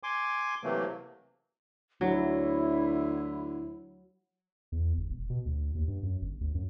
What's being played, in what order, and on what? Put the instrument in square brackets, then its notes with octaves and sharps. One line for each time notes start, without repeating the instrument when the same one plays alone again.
[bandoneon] G#5 C6 D6
C3 E3 F#3 A3 A#3
[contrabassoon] D2 [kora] F#3 [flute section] E4
[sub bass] E2
G1
E1
B2
D2
D#2
G2
F#2
G1
D2
F#2